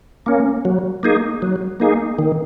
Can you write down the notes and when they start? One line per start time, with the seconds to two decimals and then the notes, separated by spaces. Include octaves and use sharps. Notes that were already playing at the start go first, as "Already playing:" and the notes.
0.26 A#3 C#4
0.65 F#3
1.03 A#3 D#4 G#4
1.42 F#3
1.80 A#3 D#4 G#4
2.19 D#3